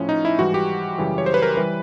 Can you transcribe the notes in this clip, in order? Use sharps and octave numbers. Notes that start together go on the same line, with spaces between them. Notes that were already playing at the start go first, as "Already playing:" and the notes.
Already playing: A2 F3 C#4
D#4
E4
G#2 E3 G3 F#4
G4
F#2 C#3 E3 G3
C#5
C5
B4
A#4
E3 G3 B4